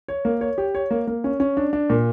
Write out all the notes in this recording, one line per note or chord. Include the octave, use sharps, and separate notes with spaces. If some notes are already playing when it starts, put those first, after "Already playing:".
C#5
A#3
C#5
G4
C#5
A#3
A#3
C#4
C#4
D4
D4
A#2